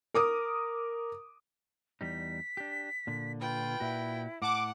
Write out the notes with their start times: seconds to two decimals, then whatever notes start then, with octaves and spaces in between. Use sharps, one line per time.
0.14 A#4 D6 D#6
2.01 E2 G3 D#4 B6
2.57 D4 G4
3.07 A#2 D3
3.40 F4 B4 G5
3.80 A#2 E4 F#4
4.42 A2 F#5 A5 D6